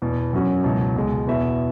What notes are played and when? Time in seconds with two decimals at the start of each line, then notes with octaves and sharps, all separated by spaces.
0.02 E2 B2 B3
0.33 F#2 F#3 C#4 F#4
0.64 C#2 B2 F#3 E4
0.96 C#2 B2 G#3
1.27 E2 B2 B3 F#4 E5